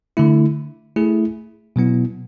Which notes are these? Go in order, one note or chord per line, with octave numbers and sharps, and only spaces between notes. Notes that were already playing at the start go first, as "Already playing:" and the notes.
D3 A3 E4
A3 E4 G#4
B2 F#3 B3 E4